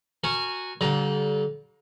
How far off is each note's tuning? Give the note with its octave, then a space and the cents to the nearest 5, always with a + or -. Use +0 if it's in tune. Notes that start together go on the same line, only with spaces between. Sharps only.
F#4 -10 A#4 -20 G#5 +0
D3 -40 G3 -35 A#5 +15